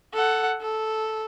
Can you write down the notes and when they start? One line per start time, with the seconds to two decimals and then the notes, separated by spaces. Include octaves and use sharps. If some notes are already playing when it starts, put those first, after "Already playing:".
0.14 A4 F#5
0.61 A4